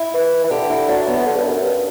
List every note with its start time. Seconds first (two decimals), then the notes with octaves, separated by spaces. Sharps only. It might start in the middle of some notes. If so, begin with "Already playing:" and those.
Already playing: E4
0.14 E3
0.44 E3
0.51 D3 G4
0.70 E4
0.88 F#3 D4
1.07 B3
1.15 E3
1.26 D3
1.37 G2
1.44 F#2
1.63 G2